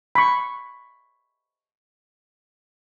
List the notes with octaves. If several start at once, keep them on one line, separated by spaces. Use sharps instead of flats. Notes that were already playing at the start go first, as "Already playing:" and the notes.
B5 C#6